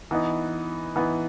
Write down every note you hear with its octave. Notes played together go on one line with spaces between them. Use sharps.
E3 B3 D#4
E3 B3 D#4